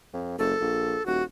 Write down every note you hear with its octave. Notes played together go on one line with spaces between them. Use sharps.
F2
F#1 A4
A#1
D#1 F#4